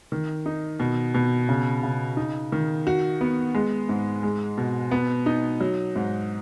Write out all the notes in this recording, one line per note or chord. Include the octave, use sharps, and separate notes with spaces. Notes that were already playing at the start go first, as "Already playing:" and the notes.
D#3
D#4
B2
B2
C#3
C#3
D#4
D#3
F#4
B3
G#3
G#2
G#3
B2
B3
D#4
F#3
G#2